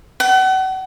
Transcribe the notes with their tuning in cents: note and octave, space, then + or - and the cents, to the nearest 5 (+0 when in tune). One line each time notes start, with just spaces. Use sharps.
F#5 +35